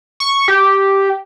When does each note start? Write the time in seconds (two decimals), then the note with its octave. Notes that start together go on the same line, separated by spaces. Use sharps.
0.20 C#6
0.48 G4